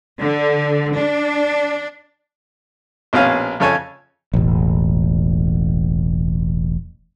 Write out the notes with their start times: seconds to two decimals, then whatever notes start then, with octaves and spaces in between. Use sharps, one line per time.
0.19 D3
0.96 D4
3.13 A#1 B2 C4 C#4 F5 G#5
3.60 F2 C#3 A4 C#5 G#5
4.34 E1 A1